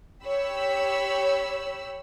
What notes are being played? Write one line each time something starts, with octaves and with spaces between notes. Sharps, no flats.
G4 C#5 B5 E6